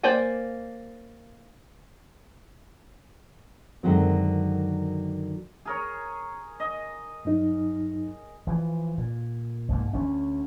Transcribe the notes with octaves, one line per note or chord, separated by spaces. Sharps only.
A#3 C5 D5 G5 G#5
F#2 D3 D#3 F#3 G#3 C4
G#4 A#4 C#5
D#5
G2 F#3 D#4
E3 F3
A#2
C2 G#2 A#3
D2 B3 C#4